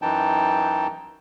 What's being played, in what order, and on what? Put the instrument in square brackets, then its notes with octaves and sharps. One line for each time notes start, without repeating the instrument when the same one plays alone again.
[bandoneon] F#2 E3 D#4 G5 A5